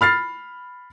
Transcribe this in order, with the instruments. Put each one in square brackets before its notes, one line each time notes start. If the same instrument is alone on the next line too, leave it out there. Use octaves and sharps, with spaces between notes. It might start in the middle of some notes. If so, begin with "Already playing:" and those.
[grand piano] B5 F6 A6 C7